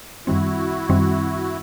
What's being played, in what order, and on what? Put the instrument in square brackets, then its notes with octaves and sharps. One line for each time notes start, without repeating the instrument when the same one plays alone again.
[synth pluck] F#2 D#3 G3 C4 [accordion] E4 F#4
[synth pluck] F#2 D#3 G3 C4